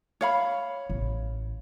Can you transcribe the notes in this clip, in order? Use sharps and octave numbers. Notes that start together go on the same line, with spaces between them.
C#5 F5 B5
A1